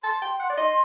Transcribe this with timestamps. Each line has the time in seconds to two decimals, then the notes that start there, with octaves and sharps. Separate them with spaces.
0.04 A5 C6
0.22 G5
0.40 F#5
0.50 D5
0.57 D#5